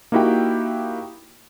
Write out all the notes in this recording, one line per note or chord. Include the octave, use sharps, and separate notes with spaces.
A#3 D#4 E4 F#4 G4 G5